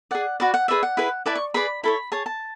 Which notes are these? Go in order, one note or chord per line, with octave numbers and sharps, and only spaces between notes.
G#4 D5 F#5
F#4 B4 D5 F#5
F#5
G#4 B4 D5 E5
F#5
E4 G#4 B4
E4 B4 D5 A5
C#6
G#4 B4 D5 B5
E4 A4 C#5 B5
G#4 C#5 A5
A5